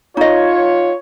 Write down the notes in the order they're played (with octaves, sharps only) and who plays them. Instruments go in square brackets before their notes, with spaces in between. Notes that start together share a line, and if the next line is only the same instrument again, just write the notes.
[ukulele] D#4 D#5 [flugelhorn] F4 [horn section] C#5